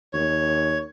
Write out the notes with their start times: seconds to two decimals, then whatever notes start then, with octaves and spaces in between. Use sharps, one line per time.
0.13 D#2 C#5